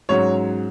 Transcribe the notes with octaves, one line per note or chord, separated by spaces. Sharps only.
G#2 F#3 C#4 C#5